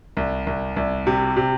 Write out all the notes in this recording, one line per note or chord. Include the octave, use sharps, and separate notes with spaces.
C2
C2
C2
C3
C3